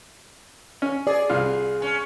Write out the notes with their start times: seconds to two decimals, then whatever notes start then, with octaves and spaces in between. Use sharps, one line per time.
0.82 C#4
1.07 G#4 D5
1.30 C2 F4
1.82 C#4